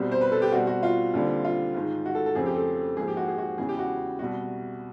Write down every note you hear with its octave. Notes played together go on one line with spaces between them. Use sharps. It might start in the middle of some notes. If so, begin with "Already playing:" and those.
Already playing: C2 B2 G3 C4
C5
B4
A4
G4
B2 G3 C4 F#4
F#4
F4
D#2 D3 G3 C4
F4
G#2 D#3 G#3
F#4
A4
A4
F2 C#3 F3 A3 C4 G#4
G4
A4
G#2 F3 A#3 G#4
G4
F#4
G#4
F#4
E2 C#3 E3 G#3 G#4
G4
F#4
C2 B2 G3 F#4